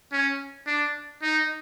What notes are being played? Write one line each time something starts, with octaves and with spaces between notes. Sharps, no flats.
C#4
D4
D#4